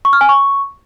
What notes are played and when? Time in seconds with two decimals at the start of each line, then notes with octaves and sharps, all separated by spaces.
0.05 C#6
0.13 F6
0.21 G#5
0.29 C#6